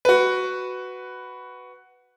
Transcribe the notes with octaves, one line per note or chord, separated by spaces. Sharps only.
F#4 B4